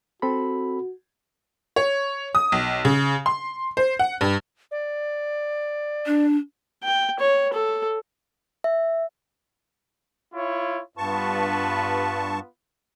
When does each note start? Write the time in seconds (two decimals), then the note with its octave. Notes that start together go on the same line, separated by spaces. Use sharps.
0.22 C4 F#4 A4 B5
1.76 C#5
2.35 D#6
2.52 B1
2.85 C#3
3.26 C6
3.77 C5
3.99 F#5
4.21 G2
4.71 D5
6.06 D4
6.84 G5
7.20 C#5
7.53 A4
8.64 E5
10.34 E4 F4 C#5
10.98 G2 B3 F4 B4 A5 C#6